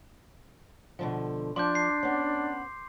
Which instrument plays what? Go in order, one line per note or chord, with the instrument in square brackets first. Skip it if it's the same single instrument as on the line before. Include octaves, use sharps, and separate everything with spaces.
[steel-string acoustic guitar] B2 D3 F3
[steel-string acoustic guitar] F3 D5 [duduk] D4 [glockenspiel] C6 D6 G6
[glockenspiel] C7
[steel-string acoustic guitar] B3 C#4